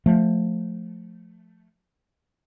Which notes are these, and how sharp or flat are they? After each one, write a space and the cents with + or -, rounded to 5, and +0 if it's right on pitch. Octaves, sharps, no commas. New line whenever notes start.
F3 +20 A3 +0